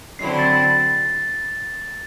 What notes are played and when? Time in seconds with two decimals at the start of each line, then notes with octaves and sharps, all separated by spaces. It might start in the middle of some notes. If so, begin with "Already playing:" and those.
0.19 D3 F#3 C4 E4 C7
0.39 A6
0.58 A6